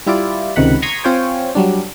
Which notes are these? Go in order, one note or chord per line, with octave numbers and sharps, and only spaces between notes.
G3 E4 F4 D5
C#2 C3 D#3 F#5 B5
A#5 C6 C#6 D#6 G#6 B6
C4 F4 C5 C#5 G5 G#5
F#3 G3 D4